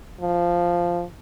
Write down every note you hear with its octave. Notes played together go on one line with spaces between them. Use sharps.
F3